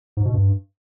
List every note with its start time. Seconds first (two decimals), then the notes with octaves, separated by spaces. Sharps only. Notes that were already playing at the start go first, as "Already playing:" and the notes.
0.17 G#2
0.25 B2
0.34 G2